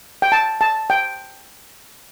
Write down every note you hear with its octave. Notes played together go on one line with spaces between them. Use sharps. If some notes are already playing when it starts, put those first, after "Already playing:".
G5
A5
A5
G5